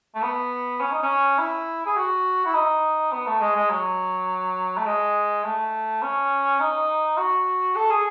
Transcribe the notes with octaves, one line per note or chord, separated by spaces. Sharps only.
A3
B3
C#4
D#4
C#4
E4
G#4
F#4
E4
D#4
B3
A3
G#3
G#3
F#3
A3
G#3
A3
C#4
D#4
F#4
A4
G#4